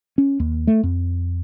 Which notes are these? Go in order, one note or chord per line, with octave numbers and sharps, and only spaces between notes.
C#4
D#2
A3
F2